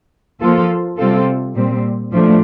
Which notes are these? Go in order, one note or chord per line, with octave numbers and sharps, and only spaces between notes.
F3 A#3 F4 A4
C3 G3 C4 F4 A4
A#2 G3 C4
A2 F3 A3 D4